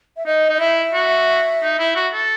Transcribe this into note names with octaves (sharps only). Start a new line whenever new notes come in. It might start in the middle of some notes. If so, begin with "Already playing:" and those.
E5
D#4 D#5
D#4 D#5
E4 E5
F#4
D#4
E4
F#4
A4